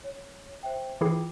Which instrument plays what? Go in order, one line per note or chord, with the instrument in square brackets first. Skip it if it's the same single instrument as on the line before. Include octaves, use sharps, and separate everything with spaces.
[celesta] C#5
C5 E5 G5
[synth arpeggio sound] E3 E4 G#4 [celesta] F4 G5 D6